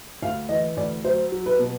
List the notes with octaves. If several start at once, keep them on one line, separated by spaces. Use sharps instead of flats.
D2 F5
E3 D#5
D2 D5
F#3 C5
F#3
B4
B2